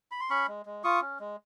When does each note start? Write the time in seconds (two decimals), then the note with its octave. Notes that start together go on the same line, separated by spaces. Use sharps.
0.11 B5
0.20 C6
0.30 C#4 B5 C#6
0.48 G#3
0.66 G#3
0.84 F4 C#6 D#6
1.01 C#4
1.20 G#3